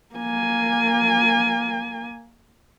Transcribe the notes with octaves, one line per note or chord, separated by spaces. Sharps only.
A#3 G#5